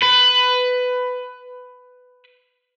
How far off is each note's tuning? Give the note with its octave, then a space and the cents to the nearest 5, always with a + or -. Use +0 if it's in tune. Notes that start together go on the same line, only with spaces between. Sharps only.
B4 +15